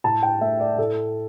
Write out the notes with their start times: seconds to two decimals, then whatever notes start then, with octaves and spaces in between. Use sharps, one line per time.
0.04 A2 A5
0.23 G5
0.41 A3 E5
0.60 D5
0.78 A2 A4